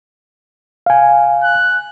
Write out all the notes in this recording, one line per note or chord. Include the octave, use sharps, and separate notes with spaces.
F5 G#5
F#6